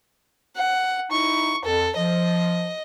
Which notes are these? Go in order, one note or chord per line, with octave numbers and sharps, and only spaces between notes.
F#5
D#4 E4 C#6
F2 A4
F3 D#5